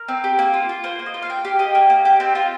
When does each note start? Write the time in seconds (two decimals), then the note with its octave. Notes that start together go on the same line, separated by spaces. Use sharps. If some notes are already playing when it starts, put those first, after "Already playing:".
Already playing: A#4
0.08 C4
0.24 G4
0.39 A#3
0.54 F4
0.69 F4
0.84 A#3 C5
0.99 A#3
1.06 D#5
1.14 F4
1.22 F5
1.29 A#3 G5
1.45 G4 F5
1.59 G4 D#5
1.75 A#3
1.90 A#3
2.05 G4
2.20 C4
2.35 F4